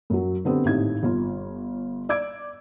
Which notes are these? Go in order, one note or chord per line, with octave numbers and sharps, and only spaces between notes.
F#2 F#3
D3 B3 C4 G4
G#1 A2 D#4 G4 G#6
G1 F4
D5 D6 E6 G#6 D7